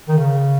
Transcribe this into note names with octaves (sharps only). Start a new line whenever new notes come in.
D#3
C#3